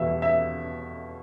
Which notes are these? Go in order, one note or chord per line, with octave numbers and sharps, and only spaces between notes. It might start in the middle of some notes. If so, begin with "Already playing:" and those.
Already playing: E2 B2 G3 E5
E5